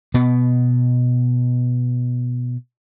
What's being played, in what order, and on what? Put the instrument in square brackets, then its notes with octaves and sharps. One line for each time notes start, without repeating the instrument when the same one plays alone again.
[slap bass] B2 B3